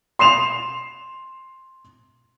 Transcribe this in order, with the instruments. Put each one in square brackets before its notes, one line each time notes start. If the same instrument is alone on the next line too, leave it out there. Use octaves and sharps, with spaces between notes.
[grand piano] C6 C7 E7 F7